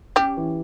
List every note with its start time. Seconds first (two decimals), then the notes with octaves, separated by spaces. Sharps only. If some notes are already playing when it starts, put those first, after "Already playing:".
0.16 G3 C#4 G4
0.37 E3